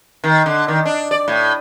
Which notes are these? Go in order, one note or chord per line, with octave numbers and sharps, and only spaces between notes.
D#3
D3
D#3
D4
D5
A2